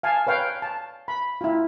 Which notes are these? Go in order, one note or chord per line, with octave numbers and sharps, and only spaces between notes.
F5 G#5 A5
B4 C#5 F5 G5
A5
B5
E4 F4